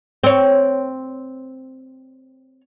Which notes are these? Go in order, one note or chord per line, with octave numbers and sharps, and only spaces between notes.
C4 C#5